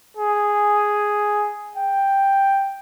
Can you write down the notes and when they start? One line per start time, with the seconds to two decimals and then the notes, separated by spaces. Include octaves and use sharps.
0.17 G#4
1.77 G5